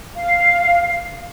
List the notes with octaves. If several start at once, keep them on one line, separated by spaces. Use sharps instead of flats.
F5